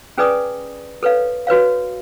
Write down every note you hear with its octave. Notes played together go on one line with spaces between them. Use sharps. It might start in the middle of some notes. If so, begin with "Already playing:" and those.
C#4 G#4 B4 D5 G#5 D#6
A4 B4 C#5 F5
F#4 B4 C#5 F5